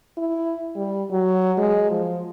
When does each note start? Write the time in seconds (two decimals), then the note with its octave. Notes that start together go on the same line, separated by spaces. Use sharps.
0.17 E4
0.76 G3
1.10 F#3
1.58 G#3
1.90 F3